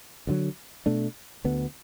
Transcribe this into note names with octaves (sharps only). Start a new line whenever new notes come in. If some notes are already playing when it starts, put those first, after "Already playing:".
D2 D3 F#3
B2 A3 D4
D2 D3 B3